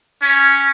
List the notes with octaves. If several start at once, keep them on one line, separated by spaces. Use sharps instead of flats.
C#4